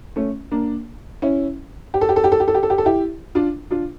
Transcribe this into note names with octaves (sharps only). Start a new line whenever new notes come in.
A3 C#4
A#3 D4
C#4 E4
G4
A4
G4
A4
G4
A4
G4
A4
G4
A4
G4
A4
E4 G4
D4 F4
D4 F4